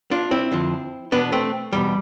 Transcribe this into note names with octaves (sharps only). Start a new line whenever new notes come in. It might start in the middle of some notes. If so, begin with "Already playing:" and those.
D4 F4
C4 E4
F2 D3 F3
E2 B2 B3 D4
A3 C4
E2 B2 G3